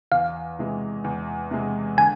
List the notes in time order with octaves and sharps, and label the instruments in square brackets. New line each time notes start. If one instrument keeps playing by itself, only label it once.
[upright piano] E2 [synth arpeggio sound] F5
[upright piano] C3 E3 G#3
E2
C3 E3 G#3
[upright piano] D3 [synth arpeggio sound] G#5